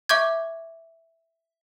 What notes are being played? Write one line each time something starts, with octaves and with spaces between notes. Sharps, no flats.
E5 C#6 D6 G6 G#6